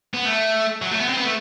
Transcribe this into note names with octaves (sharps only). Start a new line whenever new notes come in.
B3
A3
F#3
A3
B3
C4
B3
A3